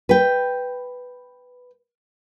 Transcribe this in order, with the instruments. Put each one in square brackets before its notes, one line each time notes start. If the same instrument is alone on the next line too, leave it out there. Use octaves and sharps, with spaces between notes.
[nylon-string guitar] B4 G5